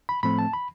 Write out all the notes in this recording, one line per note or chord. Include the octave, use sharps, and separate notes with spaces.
B5
A2 F3 A3 C4 B5
A5
B5